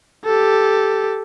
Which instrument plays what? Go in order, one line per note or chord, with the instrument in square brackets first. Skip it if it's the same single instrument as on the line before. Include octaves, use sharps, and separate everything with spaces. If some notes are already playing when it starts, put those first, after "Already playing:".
[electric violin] G4 A4